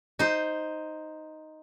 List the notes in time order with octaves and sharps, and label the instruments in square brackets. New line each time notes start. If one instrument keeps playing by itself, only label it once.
[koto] D#4 C5